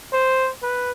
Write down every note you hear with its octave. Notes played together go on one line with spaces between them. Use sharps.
C5
B4